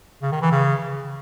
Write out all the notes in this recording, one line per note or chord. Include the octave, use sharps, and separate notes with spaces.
C#3
D#3
E3
C#3